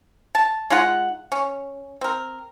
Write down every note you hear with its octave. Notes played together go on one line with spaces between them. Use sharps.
A5
G#3 D#4 F4 F#5
C#4
C4 A#4